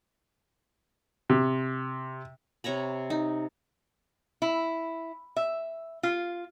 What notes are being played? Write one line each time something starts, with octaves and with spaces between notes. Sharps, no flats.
C3
C3 C#5 A#5 B5
D#4
E4
E5
F4